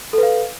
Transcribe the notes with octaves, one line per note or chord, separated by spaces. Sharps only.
A4 B4 F5